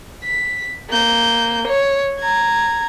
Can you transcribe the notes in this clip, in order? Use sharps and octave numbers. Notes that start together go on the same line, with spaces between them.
B6
A#3 G6
C#5
A#5 G#6